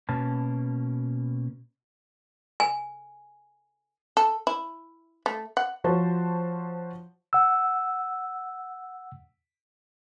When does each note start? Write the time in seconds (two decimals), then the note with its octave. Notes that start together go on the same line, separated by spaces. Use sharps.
0.09 B2 A#3 C#4 A5
2.60 G#5
4.17 A4
4.47 E4
5.26 A3
5.57 F#5
5.84 F3 F#4 C5 C#5 A5
7.33 F#5 E6